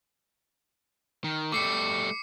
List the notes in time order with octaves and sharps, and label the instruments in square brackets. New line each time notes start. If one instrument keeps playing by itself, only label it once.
[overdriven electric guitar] D#3
[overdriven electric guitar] G3 A3 [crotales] D6 C7 C#7